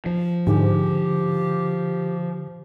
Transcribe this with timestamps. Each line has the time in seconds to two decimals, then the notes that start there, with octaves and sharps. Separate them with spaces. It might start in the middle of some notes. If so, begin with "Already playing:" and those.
0.06 F3
0.47 G#2 D3 G4